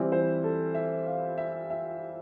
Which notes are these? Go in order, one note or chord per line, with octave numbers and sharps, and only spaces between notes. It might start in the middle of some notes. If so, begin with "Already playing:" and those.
Already playing: E3 G3 C4 E4
C5
A4
E5
F5
E5
E5